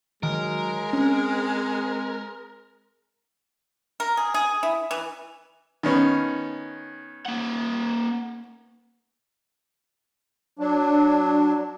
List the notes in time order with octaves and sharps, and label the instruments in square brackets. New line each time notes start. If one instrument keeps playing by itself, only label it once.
[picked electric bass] D#3 [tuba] F#3 [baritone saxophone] G#3 [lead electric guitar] A#4
[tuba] C4 [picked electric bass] C#4
[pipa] A#4
G#4
G#4
E4
E3
[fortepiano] D#3 B3 C#4
[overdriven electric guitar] A#3 F#5
[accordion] F#3 D4